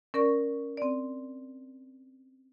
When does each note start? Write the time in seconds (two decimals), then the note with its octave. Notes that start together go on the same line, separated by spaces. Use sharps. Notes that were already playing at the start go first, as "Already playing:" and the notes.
0.14 C#4 A#4 D5 C#6
0.77 C4 D5